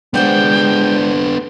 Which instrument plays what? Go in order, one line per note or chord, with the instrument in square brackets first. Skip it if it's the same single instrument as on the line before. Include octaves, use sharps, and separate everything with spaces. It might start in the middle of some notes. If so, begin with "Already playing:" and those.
[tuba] G#3 [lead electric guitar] B3 D4 [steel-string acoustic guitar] C5 D5 F#5 [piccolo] G5